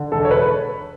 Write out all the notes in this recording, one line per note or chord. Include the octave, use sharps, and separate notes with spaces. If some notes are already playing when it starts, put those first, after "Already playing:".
Already playing: D3
E1 A4
C#5
B4